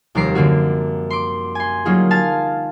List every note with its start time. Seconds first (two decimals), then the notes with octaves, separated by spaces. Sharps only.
0.15 F1 D#2 G3 A#5 D6 C7
0.35 F#2 D3 A#3 F#4
1.10 C6 D6
1.55 G#5 C6
1.85 F#3 G3 A#3 D#4 F4 G#4
2.11 F5 G#5 A5 F6 A6